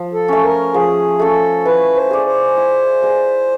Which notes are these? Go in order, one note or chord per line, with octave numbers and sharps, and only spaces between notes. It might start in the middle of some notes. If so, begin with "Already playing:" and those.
Already playing: F3
A4
A3 C#4
A#4
F3 G#4
A3 C#4 A4
E4 B4
C5
G#4 B4 D5
C5
E4
G#4 B4 D5